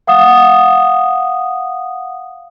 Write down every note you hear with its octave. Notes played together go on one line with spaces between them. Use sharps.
F5 F#5 D#6